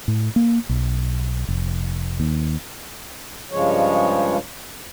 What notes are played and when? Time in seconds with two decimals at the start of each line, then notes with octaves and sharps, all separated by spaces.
0.08 A2
0.36 A#3
0.69 B1
1.49 F1
2.20 D#2
3.51 G2 C#3 F3 G#3 C#5